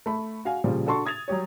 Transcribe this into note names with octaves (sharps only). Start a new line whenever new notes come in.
A3 B5
F#4 F5 G#5
A#2 C#3 F3 G3
D4 F#4 A4 A5 C6 C#6
D#6 G#6 A6 F7
F#3 G3 G4 C#5